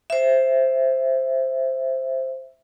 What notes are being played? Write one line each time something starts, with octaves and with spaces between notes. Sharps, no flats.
C5 E5